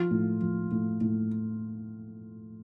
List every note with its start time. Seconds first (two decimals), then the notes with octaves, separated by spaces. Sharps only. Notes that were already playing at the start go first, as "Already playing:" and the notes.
Already playing: F3 F4
0.11 A2
0.41 F3
0.71 A2
1.01 A2